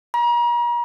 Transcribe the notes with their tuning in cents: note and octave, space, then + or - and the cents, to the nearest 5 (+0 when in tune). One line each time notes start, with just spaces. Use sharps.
A#5 +40